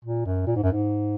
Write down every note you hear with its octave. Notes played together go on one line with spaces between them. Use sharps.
A#2
F#2
A#2
G#2
F#2
G#2